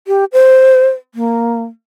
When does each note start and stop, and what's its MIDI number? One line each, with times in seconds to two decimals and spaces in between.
0.07 0.25 67
0.33 0.88 72
1.15 1.63 58